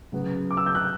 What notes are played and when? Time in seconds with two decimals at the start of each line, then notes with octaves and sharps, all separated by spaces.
0.12 C#3 F#3 B3
0.51 D6
0.57 E6
0.66 G6
0.75 F#6